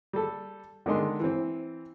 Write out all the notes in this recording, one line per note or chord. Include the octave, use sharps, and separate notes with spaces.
G3 A4
D3 D#3 G#3 C6
E3 C4